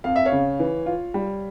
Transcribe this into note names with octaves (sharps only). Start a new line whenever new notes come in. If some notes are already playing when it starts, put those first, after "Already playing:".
F2 F5
E5
C#5 F5
C#3
E3
F4
G3